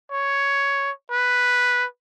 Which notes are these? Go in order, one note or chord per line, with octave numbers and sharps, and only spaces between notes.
C#5
B4